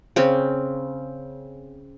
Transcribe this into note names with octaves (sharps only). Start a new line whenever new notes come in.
C#3 C4